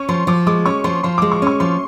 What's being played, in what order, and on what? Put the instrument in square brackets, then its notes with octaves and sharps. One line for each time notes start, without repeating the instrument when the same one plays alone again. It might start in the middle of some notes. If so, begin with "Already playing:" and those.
Already playing: [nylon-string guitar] C#4 [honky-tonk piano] C#6
[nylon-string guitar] F3 [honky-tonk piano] C6
[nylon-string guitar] F3 [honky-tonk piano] D6
[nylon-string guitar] G#3 [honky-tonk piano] D6
[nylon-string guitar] C#4 [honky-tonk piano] C#6
[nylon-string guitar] F3 [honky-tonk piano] C6
[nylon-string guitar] F3 [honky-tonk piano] C6
[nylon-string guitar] G#3 [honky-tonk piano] D6
[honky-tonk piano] C#6
[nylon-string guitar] C#4 [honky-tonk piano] C#6
[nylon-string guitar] F3 [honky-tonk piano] C6